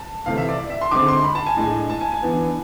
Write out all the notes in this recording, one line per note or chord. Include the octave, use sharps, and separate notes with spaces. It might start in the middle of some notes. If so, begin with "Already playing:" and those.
Already playing: A5
C3 E3 A3 F5
E5
D5
E5
C6
D3 G#3 C4 D6
C6
B5
A5
G#5
A2 G#3 D4
A5
G#5
G#5
E3 B3 D4